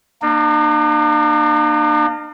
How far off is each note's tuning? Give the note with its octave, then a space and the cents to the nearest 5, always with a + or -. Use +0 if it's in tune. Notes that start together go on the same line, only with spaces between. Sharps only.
A#3 +5 D4 +45